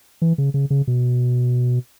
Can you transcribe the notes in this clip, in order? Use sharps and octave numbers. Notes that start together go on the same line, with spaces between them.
E3
C#3
C#3
C#3
B2